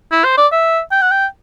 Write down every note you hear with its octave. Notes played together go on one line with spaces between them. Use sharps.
E4
C5
D5
E5
G5
F#5
G5